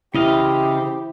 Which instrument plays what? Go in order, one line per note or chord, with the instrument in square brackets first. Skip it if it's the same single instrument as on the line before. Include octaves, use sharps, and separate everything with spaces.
[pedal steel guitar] C#3 D#5 F5 [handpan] E4 [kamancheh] G4 C5